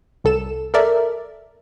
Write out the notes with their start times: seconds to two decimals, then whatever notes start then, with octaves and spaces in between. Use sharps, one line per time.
0.24 C2 A4 E7
0.74 A4 A#4 D5 E5